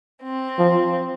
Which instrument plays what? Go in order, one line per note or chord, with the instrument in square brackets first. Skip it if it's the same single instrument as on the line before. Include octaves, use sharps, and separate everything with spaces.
[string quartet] C4
[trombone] F3